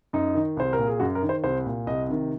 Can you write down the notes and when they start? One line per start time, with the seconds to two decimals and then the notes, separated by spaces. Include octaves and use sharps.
0.13 F#2 D#4
0.35 D#3
0.57 C2 C5
0.73 A#4
0.79 A#2
0.87 G#4
1.00 F#2 F#4
1.15 A#4
1.22 D#3
1.29 C5
1.44 C2 C5
1.66 A#2
1.87 C2 D#5
2.09 C3 D#3